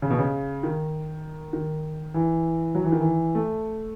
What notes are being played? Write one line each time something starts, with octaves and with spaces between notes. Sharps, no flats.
C#3
B2
C#3
D#3
D#3
E3
F#3
E3
D#3
E3
A3